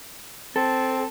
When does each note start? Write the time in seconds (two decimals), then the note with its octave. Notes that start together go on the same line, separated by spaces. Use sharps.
0.56 C4 A4